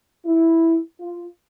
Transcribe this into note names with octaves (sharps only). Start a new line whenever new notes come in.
E4
F4